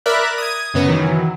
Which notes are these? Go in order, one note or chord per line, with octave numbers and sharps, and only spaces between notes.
A#4 D5 E5 B5 D6 F#6
D#6 G#6
F#2 C#3 B3 A#6
D#3 E3 F#3